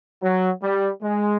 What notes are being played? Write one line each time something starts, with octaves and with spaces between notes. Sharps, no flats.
F#3
G3
G#3